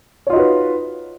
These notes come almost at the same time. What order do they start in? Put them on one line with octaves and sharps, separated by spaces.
C#5 F4 D#4 F#4 B4